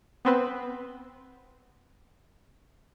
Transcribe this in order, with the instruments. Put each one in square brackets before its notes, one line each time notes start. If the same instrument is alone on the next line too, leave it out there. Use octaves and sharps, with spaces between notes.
[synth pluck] B3 C4 B4